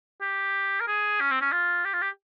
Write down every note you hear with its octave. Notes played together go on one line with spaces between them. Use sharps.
G4
A#4
G#4
C#4
C4
C#4
F4
G4
F4
G4